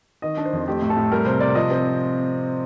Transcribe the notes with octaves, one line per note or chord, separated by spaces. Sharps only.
D#3 D#5
D4
C5
F2
A3 G4
A2
A4
A2
G3 A#4
C3 C5
C3 D5
F3 D#5
C4